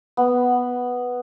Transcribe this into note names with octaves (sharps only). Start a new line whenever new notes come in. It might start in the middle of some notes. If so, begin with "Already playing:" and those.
B3